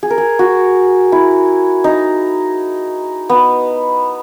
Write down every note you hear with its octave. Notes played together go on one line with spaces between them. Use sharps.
G#4
A#4
G#4
F#4
E4
D#4
B3